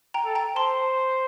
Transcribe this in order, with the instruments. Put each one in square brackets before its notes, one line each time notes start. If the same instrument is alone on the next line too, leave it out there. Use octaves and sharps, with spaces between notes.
[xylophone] G5 A#5
[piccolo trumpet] A4
[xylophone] G5 A#5
[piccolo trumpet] C5 [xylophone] A5 C6